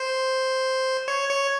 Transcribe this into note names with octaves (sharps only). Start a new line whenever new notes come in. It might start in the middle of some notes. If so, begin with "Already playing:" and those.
Already playing: C5
C#5
C#5